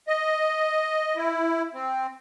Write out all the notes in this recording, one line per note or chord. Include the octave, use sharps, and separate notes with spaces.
D#5
E4
C4